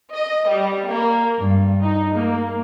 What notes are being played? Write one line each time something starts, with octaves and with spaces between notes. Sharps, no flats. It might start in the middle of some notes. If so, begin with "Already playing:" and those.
D#5
G3
A#3
G2
D#4
A#3